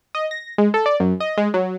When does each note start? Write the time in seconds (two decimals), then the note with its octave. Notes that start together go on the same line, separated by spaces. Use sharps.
0.15 D#5
0.31 A#6
0.58 G#3
0.74 A4
0.86 D5
1.00 F#2
1.20 D#5
1.37 G#3
1.54 F#3